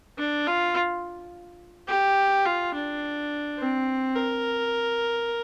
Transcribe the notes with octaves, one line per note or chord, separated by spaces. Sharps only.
D4
F4
G4
F4
D4
C4
A#4